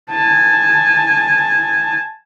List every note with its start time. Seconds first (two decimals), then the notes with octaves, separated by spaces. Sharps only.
0.10 G#5 A5